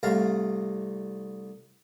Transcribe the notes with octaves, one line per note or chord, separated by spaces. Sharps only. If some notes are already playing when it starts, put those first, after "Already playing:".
C2 A3 F5 A#5